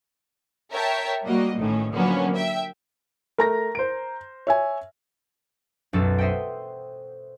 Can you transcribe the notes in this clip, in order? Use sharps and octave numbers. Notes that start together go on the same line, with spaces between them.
A#4 C#5 E5 G5 A5
G3 A#3 F#4 D#5
A1 A2 D#3 C#4
D3 F3 F#3 A#3 B3 C#4
E5 G5
A3 A#4 A#5 A#6
C5 D7
C#5 E5 G#5
B1 F#2 F#3 A4
C5 D#5 E5 F#5 G5